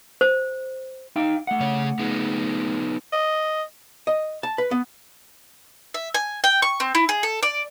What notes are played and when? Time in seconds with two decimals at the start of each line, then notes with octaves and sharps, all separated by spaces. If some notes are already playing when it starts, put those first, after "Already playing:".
0.21 C5
1.16 D#4 F5 G5
1.47 A3 F#5
1.60 C#3 C#5
1.99 B3 D#4 G#4
3.12 D#5
4.07 D#5
4.43 A5
4.58 B4
4.71 B3
5.94 E5
6.15 G#5
6.44 G5
6.62 C#6
6.80 C4
6.95 E4
7.09 G#4
7.23 A4
7.43 D5